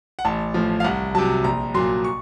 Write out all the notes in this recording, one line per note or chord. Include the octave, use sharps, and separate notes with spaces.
F#5
A1 A5
A2 F3
F5
C2 F#5
C3 F#3 A5
A#1 A#5
A#2 F#3 C6
C#6